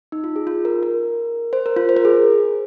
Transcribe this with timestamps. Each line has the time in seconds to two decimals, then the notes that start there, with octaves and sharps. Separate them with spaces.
0.12 D#4
0.24 F4
0.36 G#4
0.47 F4
0.65 A#4
0.83 A#4
1.53 C5
1.66 A#4
1.76 F4
1.89 C5
1.97 A#4
2.05 G#4